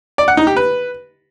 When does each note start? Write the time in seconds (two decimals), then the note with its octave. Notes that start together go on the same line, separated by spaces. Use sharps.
0.18 D5
0.28 F#5
0.37 D#4
0.47 G4
0.56 B4